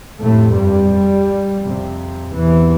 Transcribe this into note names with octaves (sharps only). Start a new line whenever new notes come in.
F2 A2 C3 A3
G2 G3
G2
F2 C3
E2 C3 E3